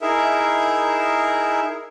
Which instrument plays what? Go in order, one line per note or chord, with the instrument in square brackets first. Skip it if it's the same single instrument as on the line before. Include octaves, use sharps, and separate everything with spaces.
[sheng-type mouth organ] D#4 E4 G#4 A#4 E5